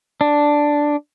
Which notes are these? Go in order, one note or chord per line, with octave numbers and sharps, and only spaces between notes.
D4